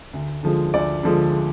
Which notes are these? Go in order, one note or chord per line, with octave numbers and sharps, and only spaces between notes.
D2
D3 F3 G#3
D2 D5
D3 F3 G#3